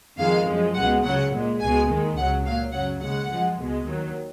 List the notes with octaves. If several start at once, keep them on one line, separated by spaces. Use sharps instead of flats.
F2 D#3 G#3 F5
F#2 F3 G#3
C#2 B2 G#3 F#5
C#2 C#3 F#3 F#5
A#2 G#3
C#2 B2 G#3 G#5
D#2 D#3 G#3
C#2 C#3 F#3 F#5
A#2 F#3 F5
F#2 C#3 F#3 F#5
D#2 C#3 G#3 F#5
F#2 F3 G#3
C#2 B2 G#3
D#2 D#3 F#3